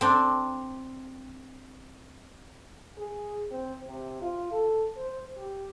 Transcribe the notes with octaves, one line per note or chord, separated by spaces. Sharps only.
C4 D4
G#4
C4
C3
F4
A4
C5
G4